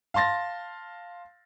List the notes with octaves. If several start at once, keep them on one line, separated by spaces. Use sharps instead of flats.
F5 A5 C6 A6 A#6